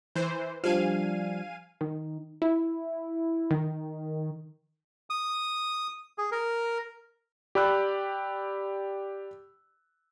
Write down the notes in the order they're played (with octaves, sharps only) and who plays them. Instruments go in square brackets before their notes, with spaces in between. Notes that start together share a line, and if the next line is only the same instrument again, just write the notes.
[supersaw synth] E3 C5
[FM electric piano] F3 G3 D4 [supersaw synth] F5 G#5 D#7
[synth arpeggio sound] D#3
E4
D#3
[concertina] D#6
G#4
A#4
[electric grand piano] G4 D5 B5 E6 F#6